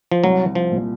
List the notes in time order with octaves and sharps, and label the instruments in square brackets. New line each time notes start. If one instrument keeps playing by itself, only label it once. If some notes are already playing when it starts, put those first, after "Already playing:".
[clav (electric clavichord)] F3
[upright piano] C2 [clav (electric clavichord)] F#3
[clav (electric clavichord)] F3
[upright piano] A#2